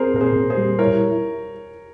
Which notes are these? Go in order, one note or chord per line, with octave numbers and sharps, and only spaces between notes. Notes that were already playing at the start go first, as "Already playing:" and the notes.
Already playing: C4 G#4 A#4 C5
A#2 A#4
G#4 C5
A#2
G#4 C5
G3
E4 A#4 C#5